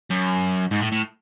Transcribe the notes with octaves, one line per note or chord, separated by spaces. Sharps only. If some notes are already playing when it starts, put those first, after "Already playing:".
F#2
G#2
A2
A2